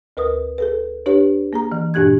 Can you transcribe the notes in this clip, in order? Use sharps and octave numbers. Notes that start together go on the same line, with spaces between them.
D2 A#4 B4 D#6
G#4 A4 B4
D4 G4 B4 C#5
A#3 G#4 A#5
E3
G2 A#2 D4 G4 F#6 G#6